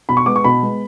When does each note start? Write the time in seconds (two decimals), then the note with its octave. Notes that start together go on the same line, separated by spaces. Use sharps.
0.09 B2 B5
0.17 C#6
0.26 G#3 B3 D6
0.36 C#6
0.44 B2 B5
0.62 G#3 B3